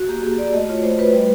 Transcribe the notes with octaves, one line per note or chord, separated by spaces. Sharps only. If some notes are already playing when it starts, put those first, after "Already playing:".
Already playing: F#4
A#3 G4
A#3 G#4
F#4 D5
A3 D#5
F4 C#5
A3 C5
A3 B4
G3 B4